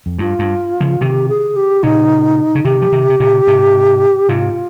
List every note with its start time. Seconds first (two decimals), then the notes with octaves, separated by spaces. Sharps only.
0.06 F2
0.19 G2 F4
0.39 G2
0.81 C#3 F3
1.01 C3 D#3 G4
1.29 G#4
1.56 G4
1.83 A#2 C#3 D#4
2.55 C#3
2.65 C3 D#3 G4
2.82 F3
2.92 C3 D#3
3.10 C3
3.20 A#2 C#3
3.47 G#2 C3
4.29 G#2 C3 F4